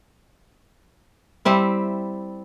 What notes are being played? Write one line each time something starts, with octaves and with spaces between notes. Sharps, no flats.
G3 C4 E4